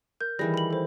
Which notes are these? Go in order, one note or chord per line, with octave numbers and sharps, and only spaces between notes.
A#4 G6
D#3 E3 G3 G#4 B4 A#6
B5 F#7
A4 C5